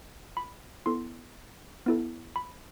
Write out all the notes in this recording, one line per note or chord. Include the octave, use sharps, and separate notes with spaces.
B5
B3 E4 A4 C6
B3 E4 A4
B5